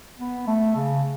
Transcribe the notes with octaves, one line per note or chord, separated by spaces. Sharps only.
B3
A3
C#3